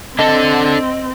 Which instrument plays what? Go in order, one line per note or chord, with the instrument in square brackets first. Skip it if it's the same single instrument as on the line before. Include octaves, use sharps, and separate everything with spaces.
[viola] C4 [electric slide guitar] D4 A4 [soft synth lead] D#5